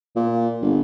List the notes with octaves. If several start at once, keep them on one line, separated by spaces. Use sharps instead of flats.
A#2
G1